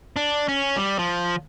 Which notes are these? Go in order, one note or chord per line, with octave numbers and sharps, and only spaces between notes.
D4
C#4
G3
F3